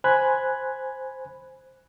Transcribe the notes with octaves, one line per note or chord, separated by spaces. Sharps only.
C5 G#5 B5 F#6 G#6